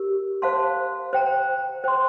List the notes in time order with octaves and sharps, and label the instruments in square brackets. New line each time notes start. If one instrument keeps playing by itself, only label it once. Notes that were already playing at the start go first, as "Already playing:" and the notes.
Already playing: [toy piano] G4 A#4
C5 F5 A5 C6
C5 G5 A#5
C5 G5 C6